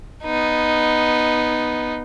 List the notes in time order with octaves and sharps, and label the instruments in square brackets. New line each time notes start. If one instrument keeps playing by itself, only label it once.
[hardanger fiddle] B3 D#4